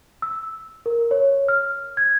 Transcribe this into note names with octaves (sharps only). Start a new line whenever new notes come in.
E6
A#4
C#5
F6
G#6